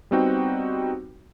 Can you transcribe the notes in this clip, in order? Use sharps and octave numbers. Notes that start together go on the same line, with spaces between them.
G3 B3 C4 D#4 F#4 G5